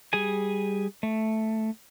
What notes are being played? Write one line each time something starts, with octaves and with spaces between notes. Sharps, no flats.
G3 G#4 G#5
A3